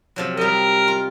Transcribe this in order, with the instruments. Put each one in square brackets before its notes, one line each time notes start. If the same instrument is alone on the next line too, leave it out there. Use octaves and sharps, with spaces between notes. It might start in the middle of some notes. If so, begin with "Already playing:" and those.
[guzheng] C3 F3 F#3
[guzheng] G3 D#5 [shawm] A#4
[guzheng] F4